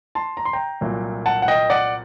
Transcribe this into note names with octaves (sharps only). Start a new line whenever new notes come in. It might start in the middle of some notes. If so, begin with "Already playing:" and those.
A5 C6
A#5
C6
G5 A#5
C2 A#2 F#3 A3
F#5 A5
F#5
D#5 G5
D5 F#5